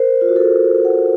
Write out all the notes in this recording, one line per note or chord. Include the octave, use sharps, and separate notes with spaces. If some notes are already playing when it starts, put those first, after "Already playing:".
Already playing: A#4 C5
F4
F#4
A4
F#5